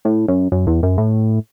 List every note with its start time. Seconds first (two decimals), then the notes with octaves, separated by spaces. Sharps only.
0.05 A2
0.28 F#2
0.52 F#2
0.67 E2
0.83 F#2
0.98 A2